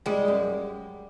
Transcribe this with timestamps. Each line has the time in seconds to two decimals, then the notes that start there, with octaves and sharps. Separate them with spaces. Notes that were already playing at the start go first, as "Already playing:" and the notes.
0.06 G3 G#3
0.28 F#2